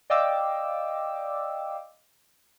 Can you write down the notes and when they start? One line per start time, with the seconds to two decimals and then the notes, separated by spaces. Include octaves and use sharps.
0.10 D5 D#5 F5 G5 D6 E6